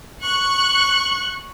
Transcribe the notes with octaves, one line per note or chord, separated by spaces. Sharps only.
C#6 F#6